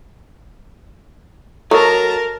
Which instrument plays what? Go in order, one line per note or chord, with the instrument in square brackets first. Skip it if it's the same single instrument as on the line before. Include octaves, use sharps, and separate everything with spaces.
[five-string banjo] F#3 [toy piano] A4 D#5 [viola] A#4 [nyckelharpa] A5 A#5